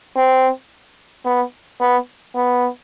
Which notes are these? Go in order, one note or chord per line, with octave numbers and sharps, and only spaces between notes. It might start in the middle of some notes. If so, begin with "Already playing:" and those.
C4
B3
B3
B3